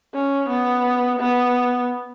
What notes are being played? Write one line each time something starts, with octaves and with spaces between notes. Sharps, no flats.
C#4
B3
B3